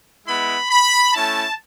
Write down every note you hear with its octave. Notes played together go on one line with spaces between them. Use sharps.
G#3 B3 E4 B5
B5
A3 C#4 E4 A5